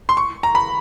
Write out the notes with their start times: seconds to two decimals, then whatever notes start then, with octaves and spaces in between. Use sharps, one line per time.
0.09 C6
0.17 C#6
0.43 A#5
0.55 B5